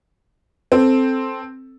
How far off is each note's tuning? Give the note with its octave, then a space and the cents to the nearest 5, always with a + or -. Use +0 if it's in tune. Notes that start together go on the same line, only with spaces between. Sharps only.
C4 +0 A4 +0